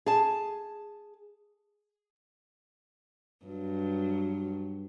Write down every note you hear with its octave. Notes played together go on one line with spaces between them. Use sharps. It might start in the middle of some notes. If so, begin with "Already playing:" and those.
G#4 A5
G2 F#3